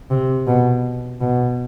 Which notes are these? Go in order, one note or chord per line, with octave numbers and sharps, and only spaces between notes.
C3
B2
B2